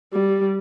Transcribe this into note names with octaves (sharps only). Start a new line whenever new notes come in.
G3